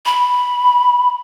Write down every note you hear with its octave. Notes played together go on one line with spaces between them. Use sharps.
B5